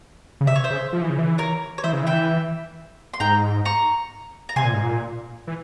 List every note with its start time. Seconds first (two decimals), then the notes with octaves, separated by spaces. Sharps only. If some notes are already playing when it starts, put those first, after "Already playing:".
0.41 C#3
0.47 C3 E5
0.56 C#5
0.64 C5 E5
0.70 C#3
0.93 F3
1.01 E3
1.10 C#3
1.19 E3
1.38 A#4 C#5
1.78 C#5
1.83 E3 C5 E5
1.93 C#3
2.03 E3 E5 G5
3.14 C6
3.20 G#2 G5 A#5
3.65 A#5 C#6
4.49 A#5
4.56 C3 G#5 C6
4.65 A#2
4.74 G#2
4.82 A#2
5.47 E3